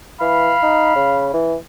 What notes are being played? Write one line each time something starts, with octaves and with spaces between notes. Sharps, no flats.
E3 F5 B5
D#4
C#3
E3